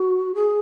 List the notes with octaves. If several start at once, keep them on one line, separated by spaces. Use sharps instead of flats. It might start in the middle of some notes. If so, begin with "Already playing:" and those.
Already playing: F#4
G#4